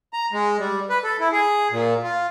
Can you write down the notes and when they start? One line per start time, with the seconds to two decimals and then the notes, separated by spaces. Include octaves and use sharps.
0.13 A#5
0.32 G#3
0.59 G3
0.90 B4
1.03 A4
1.20 E4
1.32 G#4
1.71 A#2
2.03 F4